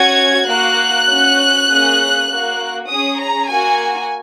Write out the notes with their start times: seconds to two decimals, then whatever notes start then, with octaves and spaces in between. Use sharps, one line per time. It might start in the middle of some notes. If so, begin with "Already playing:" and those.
Already playing: C#4 F#4 G#6
0.48 A#3 F#4 F#6
1.09 C#4 F#4
1.70 A#3 C#4 G#4
2.30 A#3 F#4
2.89 C#4 G#4 D#6
3.20 A#5
3.50 A#3 F#4 G#5